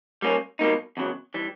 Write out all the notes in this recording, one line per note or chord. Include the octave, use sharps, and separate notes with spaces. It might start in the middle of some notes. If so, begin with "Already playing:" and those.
G3 A#3 C#4
B2 G3 A#3 D#4
E2 C#3 F#3
E3 G3